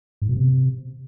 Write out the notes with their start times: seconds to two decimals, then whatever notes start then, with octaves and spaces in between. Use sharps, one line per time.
0.22 G#2
0.29 B2
0.37 C3